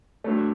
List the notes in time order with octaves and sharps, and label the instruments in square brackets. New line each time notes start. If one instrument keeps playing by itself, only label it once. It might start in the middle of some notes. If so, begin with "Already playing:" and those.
[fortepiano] G2 F#3 A3